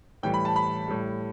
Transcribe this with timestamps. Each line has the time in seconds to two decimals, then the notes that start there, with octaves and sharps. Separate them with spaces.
0.23 A2 E3 G3 G5
0.34 B5
0.45 A5
0.56 B5
0.88 A2 G3